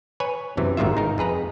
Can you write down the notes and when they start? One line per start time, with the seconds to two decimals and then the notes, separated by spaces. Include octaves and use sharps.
0.20 B4 C#5 G#5
0.57 F#2 C3 E3
0.77 G#1 G#2 C3 D#3 F4 E5
0.97 D#4 A#4
1.18 F2 G#4 B4 A#5